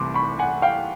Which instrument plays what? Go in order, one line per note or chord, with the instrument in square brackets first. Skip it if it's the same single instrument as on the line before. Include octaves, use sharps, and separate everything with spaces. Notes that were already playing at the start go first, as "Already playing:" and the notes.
Already playing: [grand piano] C2 C3 E3 A3 C6 D6
B5 C#6
F#5 G#5
F5 G5